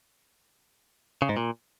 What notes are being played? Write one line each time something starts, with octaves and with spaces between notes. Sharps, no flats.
C#3
G#2
A#2